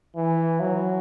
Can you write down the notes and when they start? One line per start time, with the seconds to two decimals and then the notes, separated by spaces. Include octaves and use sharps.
0.16 E3
0.60 F#3